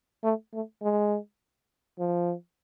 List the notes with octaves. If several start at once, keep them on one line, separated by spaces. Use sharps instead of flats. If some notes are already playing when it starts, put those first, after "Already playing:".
A3
A3
G#3
F3